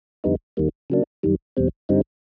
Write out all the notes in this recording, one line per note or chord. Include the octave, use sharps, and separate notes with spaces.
F2 D3 G3 B3 D#4
D#2 D#3 G3 A#3
C#3 F#3 A#3 D4
F#2 D#3 G3
E2 B2 G3 C4
G2 D3 G3 C4 D#4